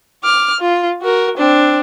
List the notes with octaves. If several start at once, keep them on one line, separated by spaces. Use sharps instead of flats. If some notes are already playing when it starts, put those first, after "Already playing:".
D6 F6
F4
F#4 A#4
C4 D4